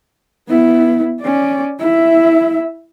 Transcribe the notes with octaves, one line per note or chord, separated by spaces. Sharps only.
B3 E4
C#4 D5
E4 E5